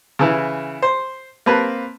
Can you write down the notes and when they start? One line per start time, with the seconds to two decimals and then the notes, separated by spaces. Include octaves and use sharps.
0.19 C#3 E3 E4
0.82 C5
1.46 A#3 C4 B4 A5